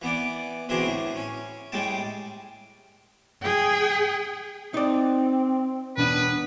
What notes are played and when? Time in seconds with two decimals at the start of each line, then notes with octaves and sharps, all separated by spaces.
0.02 E3 B3 D5
0.69 B2 D3 E3 C4 D4 G#4
0.86 A2 E4
1.16 C#4
1.72 A2 G3 G#3 G5 A5
3.42 G#4 G5
4.74 C4 D#4 D5
5.97 E1 B3 D4 B4 D#7